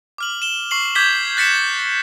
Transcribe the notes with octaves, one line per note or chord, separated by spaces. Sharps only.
D6 F6 F#7
E7 G7
C#6 C7 F#7
D6 G6 G#6 B6 G7
F#6 A6 B6 C#7 E7